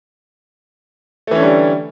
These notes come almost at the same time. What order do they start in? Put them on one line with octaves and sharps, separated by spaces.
A3 E3 C#4 D3 G3